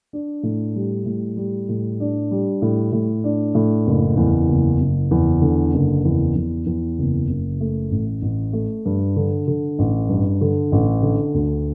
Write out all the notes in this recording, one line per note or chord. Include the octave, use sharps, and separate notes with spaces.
D4
A2
G3
A2
G3
A2
D4
G3
A2
A2
D4
A2
F#1
E2
F#1
F#1
E2
D3
F#1
E2
E2
E2
F#1
F#1
A3
A1
A1
A3
G2
D3
D3
A1
G2
D3
A1
D3
D2